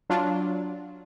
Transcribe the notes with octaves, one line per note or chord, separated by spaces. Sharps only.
F#3 D4 F4